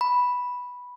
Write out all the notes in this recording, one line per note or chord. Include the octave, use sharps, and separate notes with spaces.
B5